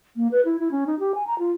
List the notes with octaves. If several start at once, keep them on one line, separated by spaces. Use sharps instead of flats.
A#3
B4
E4
E4
C#4
D#4
G4
G#5
A#5
F4